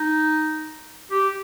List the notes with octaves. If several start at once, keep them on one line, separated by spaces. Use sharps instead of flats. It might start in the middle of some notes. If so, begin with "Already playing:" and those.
Already playing: D#4
G4